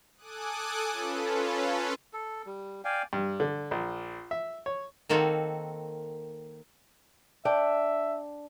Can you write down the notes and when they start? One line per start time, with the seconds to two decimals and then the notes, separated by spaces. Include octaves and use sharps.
0.17 A4 G#5 D6 D#6 F#6
0.92 C#4 F4 A4 B4
2.13 A4
2.46 G3
2.85 D5 F5 G5 G#5
3.13 G2
3.40 D3
3.71 A#1
4.31 E5
4.66 C#5
5.09 D#3 A#3 C4 F#4 A4
7.45 D4 E5 G5